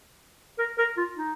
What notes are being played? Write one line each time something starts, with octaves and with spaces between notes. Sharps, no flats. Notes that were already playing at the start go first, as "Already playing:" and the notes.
A#4
A#4
F4
D#4